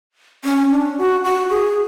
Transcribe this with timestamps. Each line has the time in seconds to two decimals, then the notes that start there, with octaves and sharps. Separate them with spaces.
0.45 C#4
0.71 D4
0.98 F#4
1.24 F#4
1.50 G#4